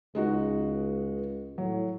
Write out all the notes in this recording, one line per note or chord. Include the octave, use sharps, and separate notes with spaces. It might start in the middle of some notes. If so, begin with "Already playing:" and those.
C#2 G#3 D#4 F#4
A2 F#3